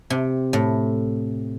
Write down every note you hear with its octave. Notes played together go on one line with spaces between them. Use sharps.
C3
A2